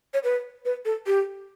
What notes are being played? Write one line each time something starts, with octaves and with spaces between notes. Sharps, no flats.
C#5
B4
B4
A4
G4